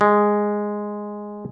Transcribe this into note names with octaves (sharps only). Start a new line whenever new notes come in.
G#3